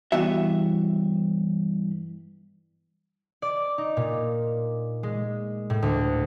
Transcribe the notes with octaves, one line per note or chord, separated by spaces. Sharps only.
G2 E3 B3 F#4 E5
D5
D#4
A#2
G#3
A2
D2